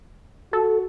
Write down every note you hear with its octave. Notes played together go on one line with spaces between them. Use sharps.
F#4 A4